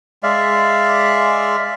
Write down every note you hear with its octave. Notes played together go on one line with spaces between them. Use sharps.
G#3 D5 E5 F5